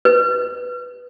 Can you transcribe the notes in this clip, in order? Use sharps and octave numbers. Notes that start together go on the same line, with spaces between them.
B4